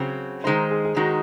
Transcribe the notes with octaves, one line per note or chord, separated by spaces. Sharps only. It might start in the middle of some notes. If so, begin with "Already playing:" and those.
Already playing: C#3 F#3 C4 F#4 G#4 C5
D#3 G#3 D#4 C5
G#4
G#4
D#3 G#3 D#4 F#4